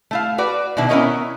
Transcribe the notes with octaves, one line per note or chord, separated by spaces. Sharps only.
A3 E4 F5
F#4 B4 D5
B2 D#3 D4 E4
B3 C#4 E4 A#4 C#5 D#5